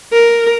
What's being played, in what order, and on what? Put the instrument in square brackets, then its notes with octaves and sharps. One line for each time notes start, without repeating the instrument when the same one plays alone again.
[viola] A#4